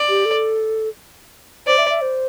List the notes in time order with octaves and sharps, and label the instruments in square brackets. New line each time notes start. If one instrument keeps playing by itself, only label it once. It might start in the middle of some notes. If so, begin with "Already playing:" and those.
Already playing: [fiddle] D5
[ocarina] G4
A4
[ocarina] C5 [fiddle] D5
[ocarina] E5
E5
C5